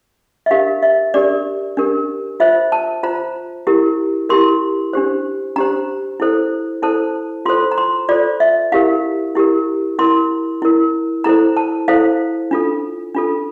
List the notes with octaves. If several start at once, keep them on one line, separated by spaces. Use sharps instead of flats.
E5
D4 G4 A#4 F5
E5
D4 G4 A#4 D5
D4 G4 A#4
F4 C5 E5
A5
F4 C5 A#5
E4 G4 A#4
E4 G4 A#4 C6
D4 G4 C5
D4 G4 C5 A#5
E4 A4 C5
E4 A4 C5 A5
F4 A4 C5 C6
A#5
C6
F4 A4 C5 D5
E5
E4 G4 A#4 F5
E4 G4 A#4
E4 A#4 C6
E4 A#4
E4 A4 C5 A#5
A5
E4 A4 C5 F5
D4 F4 A4
D4 F4 A4